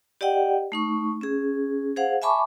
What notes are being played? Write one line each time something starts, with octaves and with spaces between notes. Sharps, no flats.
G4 D5 D#5 F#5 G5
A3 D#4 C#6
C#4 G#4
G#4 C5 F5 F#5
E5 G#5 A5 B5 C#6 D6